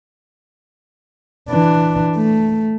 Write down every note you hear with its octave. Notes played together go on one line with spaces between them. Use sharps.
E3 D4
A3